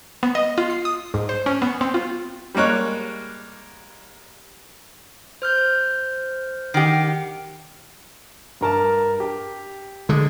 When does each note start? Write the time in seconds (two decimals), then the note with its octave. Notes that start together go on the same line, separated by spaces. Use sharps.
0.23 B3
0.35 D#5
0.58 F4
0.70 C7
0.85 D#6
1.14 G#2
1.29 C5
1.46 C#4
1.62 B3
1.81 C4
1.94 F4
2.55 G3 G#3 A#3 C#5 F#6
5.42 C5 F6 G6
6.74 D#3 G4 F#5 C7
8.61 G2 A#4 A5
9.20 G4
10.09 D3 G#3